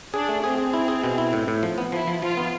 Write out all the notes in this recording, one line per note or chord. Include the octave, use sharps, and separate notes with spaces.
D4 G#4
A3
C4 G#4
G#4
E4
G#4
B2
E4
A2
A2
F3
B3
F3 E4
F3
F3 F4
B3